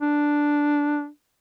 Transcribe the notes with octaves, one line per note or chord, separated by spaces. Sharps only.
D4